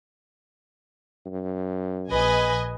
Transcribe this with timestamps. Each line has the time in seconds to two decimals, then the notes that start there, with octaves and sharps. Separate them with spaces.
1.26 F#2
2.11 A#1 B4 D#5 G#5